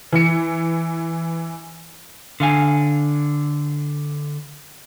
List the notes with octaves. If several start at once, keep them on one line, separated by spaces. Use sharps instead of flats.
E3 C#7
D3 F5 G#5